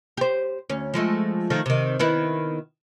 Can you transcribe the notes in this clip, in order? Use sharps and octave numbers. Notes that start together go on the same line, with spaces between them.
G4 C5
D2 C#4
F3 G#3 A3
D#3 F3 A3
C3 D#3
D#3 B3 E4